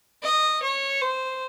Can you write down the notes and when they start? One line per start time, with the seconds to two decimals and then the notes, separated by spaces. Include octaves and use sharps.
0.23 D#5
0.63 C#5
1.01 C5